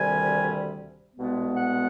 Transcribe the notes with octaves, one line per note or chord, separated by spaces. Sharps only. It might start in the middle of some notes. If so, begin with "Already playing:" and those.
Already playing: D2 C3 D#3 G3 G#5
C2 B2 G#3 B3
F#5